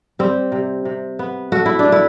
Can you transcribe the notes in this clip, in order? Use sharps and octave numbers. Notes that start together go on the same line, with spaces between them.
G3 C4
C3
C3
B3
A3 F#4
E4
D4
A3
E4